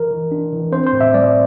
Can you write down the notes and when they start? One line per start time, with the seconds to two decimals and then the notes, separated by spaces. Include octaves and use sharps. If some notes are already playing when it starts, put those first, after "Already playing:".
Already playing: E3 A#4
0.11 E3
0.32 D4
0.53 E3
0.72 C4 C5
0.86 C5
0.93 A2
1.01 E5
1.14 G3 D5